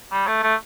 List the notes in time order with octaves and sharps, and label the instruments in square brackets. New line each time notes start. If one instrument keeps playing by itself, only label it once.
[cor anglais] G3
A3
A3